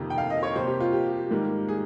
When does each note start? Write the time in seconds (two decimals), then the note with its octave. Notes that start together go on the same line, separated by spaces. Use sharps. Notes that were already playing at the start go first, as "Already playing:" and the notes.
Already playing: F2 C3 D#3 A#3
0.10 G5
0.18 F5
0.30 D#5
0.43 C#5
0.55 C3 G3 A#3 C5
0.67 G4
0.80 F4
0.92 G4
1.31 G#2 D#3 G3 A#3
1.68 G#4